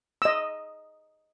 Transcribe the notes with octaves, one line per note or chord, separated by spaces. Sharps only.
D#5 E6